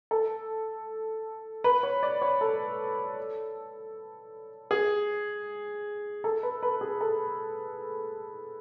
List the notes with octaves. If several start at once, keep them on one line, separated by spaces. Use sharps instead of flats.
A4
B4
C#5
D5
C#5
A4
G#4
A4
B4
B4
G#4
A4